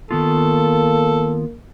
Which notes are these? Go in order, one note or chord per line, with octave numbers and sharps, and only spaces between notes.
D#3 A#3 B3 F4 A4